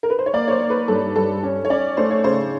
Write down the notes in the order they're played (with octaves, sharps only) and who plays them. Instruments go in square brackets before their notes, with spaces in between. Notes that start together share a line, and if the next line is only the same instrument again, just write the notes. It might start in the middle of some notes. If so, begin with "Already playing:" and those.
[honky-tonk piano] A#4
B4
C5
C#5
[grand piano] A#3 [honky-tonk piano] D5
[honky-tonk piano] C#5
C5
[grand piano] A#3
[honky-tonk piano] B4
[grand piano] G2 [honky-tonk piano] A4
[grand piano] G2 [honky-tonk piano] A4
[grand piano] C#4
[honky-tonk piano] C#5
[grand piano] C#4 [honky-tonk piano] D5
[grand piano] A3 [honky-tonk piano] C5
[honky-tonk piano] C#5
[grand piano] C#3 [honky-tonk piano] C5